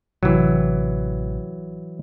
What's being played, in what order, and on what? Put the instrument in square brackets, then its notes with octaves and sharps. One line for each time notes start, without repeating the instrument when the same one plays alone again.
[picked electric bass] A1 C3 [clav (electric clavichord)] E3 F#3